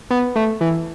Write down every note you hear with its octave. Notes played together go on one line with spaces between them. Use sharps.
B3
A3
E3